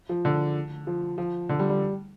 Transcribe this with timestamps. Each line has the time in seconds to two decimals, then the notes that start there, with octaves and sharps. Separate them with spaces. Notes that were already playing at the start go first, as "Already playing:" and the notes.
0.09 F3
0.25 D3
0.87 F3
1.18 F3
1.49 D3
1.59 G3
1.69 G3